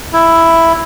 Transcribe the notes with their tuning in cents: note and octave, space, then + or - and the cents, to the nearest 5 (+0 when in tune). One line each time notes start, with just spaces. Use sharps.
E4 +5